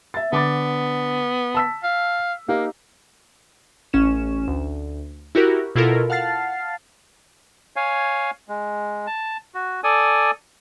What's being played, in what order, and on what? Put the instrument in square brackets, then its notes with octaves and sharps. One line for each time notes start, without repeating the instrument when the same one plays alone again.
[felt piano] E5 A6
[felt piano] D3 D6 A6 [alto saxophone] B3
[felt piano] A5 E6 B6
[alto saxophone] F5
[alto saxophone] A#3 [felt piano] D#4 G4 F5
[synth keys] A1 C#4 E7
D2
E4 F#4 G4 A#4
B2 E4 F4 A4 A#4
F5 F#5 A5 F6 A6 C7
[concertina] C#5 F5 G#5
G#3
A5
F#4
A4 D5 G#5 D#6